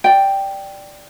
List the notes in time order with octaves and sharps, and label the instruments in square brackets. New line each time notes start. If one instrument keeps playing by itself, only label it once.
[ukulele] D5 G5